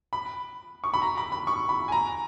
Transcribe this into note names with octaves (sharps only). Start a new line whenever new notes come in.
B5
C#6
B5
A#5
B5
B5
C#6
B5
G#5
A#5